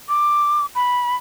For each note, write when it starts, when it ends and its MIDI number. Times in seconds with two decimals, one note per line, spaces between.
0.09 0.66 86
0.75 1.16 83